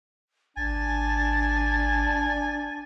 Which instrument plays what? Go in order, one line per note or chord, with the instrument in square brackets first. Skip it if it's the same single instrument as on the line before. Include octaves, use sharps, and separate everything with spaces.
[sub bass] G#1 [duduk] D4 [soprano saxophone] G#5 [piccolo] A6